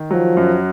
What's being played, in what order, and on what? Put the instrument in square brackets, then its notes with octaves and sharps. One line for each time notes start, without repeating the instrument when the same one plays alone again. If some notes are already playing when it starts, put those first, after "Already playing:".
Already playing: [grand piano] D#3
[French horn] F3 [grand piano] F#3
[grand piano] F#2